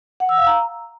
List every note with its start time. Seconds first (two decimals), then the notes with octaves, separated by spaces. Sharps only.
0.20 F#5
0.29 E6
0.38 F5
0.47 A#5